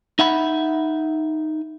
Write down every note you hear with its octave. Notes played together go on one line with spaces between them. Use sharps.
D#4 E5 F#5 B5